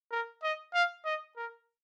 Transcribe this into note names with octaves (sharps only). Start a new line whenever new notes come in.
A#4
D#5
F5
D#5
A#4